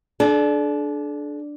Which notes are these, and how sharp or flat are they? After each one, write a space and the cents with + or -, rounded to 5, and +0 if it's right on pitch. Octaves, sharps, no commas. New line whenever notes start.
D4 +0 A4 -45